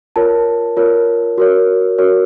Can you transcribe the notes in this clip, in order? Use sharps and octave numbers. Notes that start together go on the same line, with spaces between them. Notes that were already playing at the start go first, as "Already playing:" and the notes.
F4 A#4 C#5 A5
F4 A#4 C#5
F#4 A#4 C#5
F#4 A#4 C#5